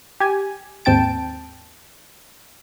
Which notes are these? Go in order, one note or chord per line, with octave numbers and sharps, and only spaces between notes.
G4 G#5
D#2 G#2 C4 G5 A5 D7